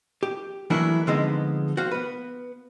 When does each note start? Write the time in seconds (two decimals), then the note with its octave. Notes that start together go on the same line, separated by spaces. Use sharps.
0.23 G4
0.70 E3 F#3 A3 A#3 D4 E4
1.07 D3 F3 G#3 B3 C4 D#4
1.77 F#4 C5 F5
1.91 B3 B4